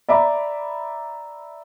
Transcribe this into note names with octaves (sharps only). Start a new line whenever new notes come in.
D5 E5 A#5 B5 D6